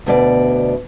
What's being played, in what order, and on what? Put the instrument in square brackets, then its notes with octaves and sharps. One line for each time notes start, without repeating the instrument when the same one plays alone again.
[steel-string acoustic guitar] D2 B2 D5